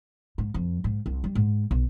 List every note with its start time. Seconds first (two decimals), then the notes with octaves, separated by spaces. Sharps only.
0.38 G#2
0.54 F2
0.84 G#2
1.06 C2
1.24 G3
1.35 G#2
1.71 B1